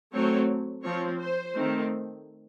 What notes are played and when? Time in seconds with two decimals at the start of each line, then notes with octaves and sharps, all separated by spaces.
0.13 F#3 A3 C4 C#5
0.84 F3 C4 C#5
1.19 C5
1.56 D#3 A3 C4